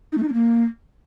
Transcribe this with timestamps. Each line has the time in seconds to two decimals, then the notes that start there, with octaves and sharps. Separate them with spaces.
0.12 D#4
0.17 A3
0.22 D#4
0.28 D4
0.33 A#3